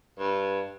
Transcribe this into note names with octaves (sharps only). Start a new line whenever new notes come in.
G2